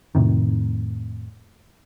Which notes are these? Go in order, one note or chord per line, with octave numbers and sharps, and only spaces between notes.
F2 A2 C3 D#3